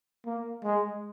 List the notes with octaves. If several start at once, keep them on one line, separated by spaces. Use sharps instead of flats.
A#3
G#3